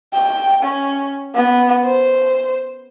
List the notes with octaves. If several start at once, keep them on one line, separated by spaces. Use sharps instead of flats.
G5
C#4
B3
C5